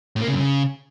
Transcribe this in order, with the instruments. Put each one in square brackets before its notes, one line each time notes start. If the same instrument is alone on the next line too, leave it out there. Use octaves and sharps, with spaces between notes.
[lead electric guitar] A2
A#3
C#3
F#2
C#3